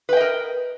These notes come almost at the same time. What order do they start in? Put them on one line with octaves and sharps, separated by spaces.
B4 G5 D#5 A#4